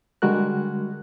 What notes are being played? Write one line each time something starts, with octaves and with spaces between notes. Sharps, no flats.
D3 G3 G#3 F#4 A#4 F#6